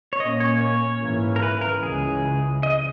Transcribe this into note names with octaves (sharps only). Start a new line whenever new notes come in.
C#5
A#2 A#3 C#4 D#5
C#5
C#5
G#2 E3 A#3 C#4
A#4
B4
A#4
C#2 C#3 E3 G#3 G#4
D#5